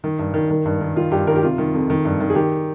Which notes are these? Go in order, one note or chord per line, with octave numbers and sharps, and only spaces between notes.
D#3
G2
D#3
D#3
G2
D#3
D#3 F4
G2 G4
D#3 A#4
G4
C3 F4
D#3
F2
D#3
G2
D#3
G#4
D#3 G4